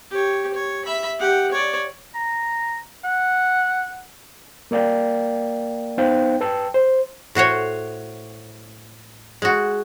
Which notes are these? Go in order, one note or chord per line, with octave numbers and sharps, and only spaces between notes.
G4 C#5
C#5
E5 B5
G4 F#5
C#5 D5
A#5
F#5
A#3 A#4 D5 F5 G5
B3 D#4 C5 F5 G5
B4 G5 A5 E6
C5
A2 F#4 C5 C#5
G#3 F#4